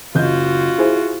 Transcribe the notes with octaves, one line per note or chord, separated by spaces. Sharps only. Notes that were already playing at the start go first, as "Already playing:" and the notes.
F#1 F4 F#4 D#5 G6
E4 G#4 C5